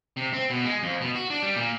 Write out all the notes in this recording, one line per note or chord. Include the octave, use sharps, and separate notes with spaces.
C3
C4
B2
G#3
F2
B2
F#4
D4
G3
A#2